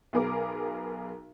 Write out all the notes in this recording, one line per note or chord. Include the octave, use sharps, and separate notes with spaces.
B1 B3 G#4 A#4 A#5 D6